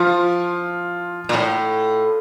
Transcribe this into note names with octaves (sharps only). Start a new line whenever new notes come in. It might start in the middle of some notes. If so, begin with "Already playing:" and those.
Already playing: F3 F4
A#2
A2